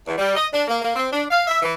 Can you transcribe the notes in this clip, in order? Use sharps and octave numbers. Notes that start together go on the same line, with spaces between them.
E2
G3
D#5
D4
A#3
A#3
C4
D4
F5
E5
E3